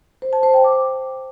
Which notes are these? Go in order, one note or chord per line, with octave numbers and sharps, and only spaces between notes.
C5
A5
C5
G5
D6